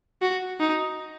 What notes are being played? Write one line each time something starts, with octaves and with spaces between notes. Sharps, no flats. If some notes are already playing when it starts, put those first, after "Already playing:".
F#4
D#4